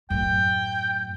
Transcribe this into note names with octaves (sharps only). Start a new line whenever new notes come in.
F#2 A2 G5